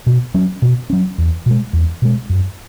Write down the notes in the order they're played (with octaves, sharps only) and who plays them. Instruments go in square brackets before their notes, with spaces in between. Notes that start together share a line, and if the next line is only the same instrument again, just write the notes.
[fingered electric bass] B2
F#3 C#4
B2
F#3 C#4
E2
B2 G#3
E2
B2 G#3
F#2